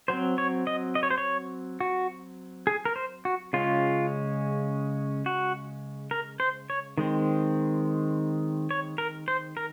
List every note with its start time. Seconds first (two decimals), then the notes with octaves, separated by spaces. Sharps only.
0.08 F#3 C4 C5
0.38 C#5
0.67 D#5
0.95 D#5
1.03 C#5
1.11 C5
1.18 C#5
1.80 F#4
2.67 G#4
2.85 A#4
2.96 C5
3.25 F#4
3.53 C#3 G#3 C#4 F4
5.26 F#4
6.11 A#4
6.40 C5
6.70 C#5
6.98 D#3 G#3 C4
8.71 C#5
8.98 A#4
9.28 C5
9.57 A#4